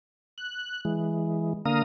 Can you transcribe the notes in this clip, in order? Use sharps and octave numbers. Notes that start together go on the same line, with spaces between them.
F#6
E3 G#3
D3 A#3 F5 A#5 D#6